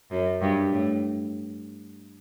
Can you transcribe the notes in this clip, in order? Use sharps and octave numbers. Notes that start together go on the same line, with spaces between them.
F#2
G2
A2